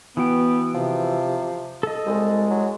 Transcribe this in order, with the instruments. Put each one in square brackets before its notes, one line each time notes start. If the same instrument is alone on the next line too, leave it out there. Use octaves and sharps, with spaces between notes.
[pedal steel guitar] E3 F#4 G5 [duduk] B3
[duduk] C3 [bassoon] F3
[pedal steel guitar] A4 D#5
[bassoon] C2 [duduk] G#3
[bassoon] F#3